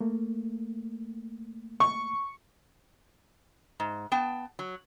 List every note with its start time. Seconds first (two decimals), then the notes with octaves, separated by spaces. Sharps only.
0.01 A3 A#3
1.80 C#6
3.80 G#2
4.12 B3 G5 A5
4.59 F#3